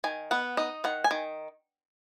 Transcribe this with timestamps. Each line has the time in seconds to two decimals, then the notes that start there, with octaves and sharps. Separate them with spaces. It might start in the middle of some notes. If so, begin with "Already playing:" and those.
0.04 D#3 G#5
0.31 B3 F#5
0.57 D#4 D#5
0.84 D#3 F#5
1.04 G#5
1.11 D#3